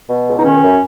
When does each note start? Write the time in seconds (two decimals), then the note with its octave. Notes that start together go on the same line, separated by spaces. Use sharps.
0.09 B2
0.27 C#2
0.37 D#4
0.43 D#3 C#4
0.61 F#2